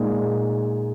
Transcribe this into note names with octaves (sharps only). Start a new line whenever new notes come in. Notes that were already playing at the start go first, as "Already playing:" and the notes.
Already playing: A#2 G#3 D#4